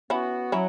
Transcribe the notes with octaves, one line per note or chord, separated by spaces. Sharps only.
B3 C#4 E4 F#4
F#3 C#4 E4